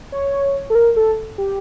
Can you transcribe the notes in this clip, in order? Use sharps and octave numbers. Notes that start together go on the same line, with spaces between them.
C#5
A4
A#4
A4
G4